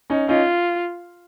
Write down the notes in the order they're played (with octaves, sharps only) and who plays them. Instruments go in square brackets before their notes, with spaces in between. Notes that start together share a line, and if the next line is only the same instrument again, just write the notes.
[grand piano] C#4 D#4
[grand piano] C#4 D#4 [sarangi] F4